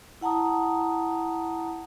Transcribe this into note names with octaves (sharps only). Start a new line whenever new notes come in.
E4 F#5 A5 A#5 D#6